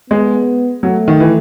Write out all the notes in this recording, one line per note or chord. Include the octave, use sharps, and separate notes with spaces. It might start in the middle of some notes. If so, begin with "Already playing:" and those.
G#3 B3
F#3 A3
D#3
E3